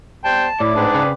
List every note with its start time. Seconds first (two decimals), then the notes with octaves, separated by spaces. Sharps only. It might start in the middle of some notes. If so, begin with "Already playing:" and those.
0.24 G3 B3 C5 G5 A5
0.60 A2 E4 D5
0.75 G#2 C4 D4 G#4 B4
0.95 C#3